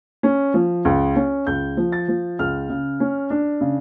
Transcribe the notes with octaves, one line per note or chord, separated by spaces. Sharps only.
C#4
F3
C#2
C#4
C#2 G6
F3
A6
F3
C#2 F6
C#3
C#4
D4
C#3